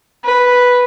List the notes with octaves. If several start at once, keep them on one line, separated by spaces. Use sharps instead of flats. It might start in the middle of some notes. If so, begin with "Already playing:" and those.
B4